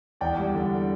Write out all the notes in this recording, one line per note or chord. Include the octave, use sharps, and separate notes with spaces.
E2 D5 G5
G3
D3